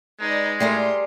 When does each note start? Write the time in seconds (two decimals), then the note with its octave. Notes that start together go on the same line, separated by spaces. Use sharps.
0.20 G#3 D#4 B4 D5
0.60 A2 G3 G#4 A#4 C6